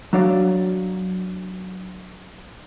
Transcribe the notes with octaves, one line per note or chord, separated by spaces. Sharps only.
F#3 D4 C#5 D5 F5